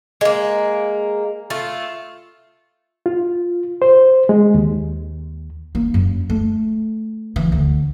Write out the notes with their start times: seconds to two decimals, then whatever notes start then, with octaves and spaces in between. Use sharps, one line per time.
0.21 G#3 A#3
1.50 A3 F4
3.06 F4
3.82 C5
4.29 G#3
4.54 D#2
5.75 A#3
5.94 F#2
6.30 A3
7.36 E3
7.52 D2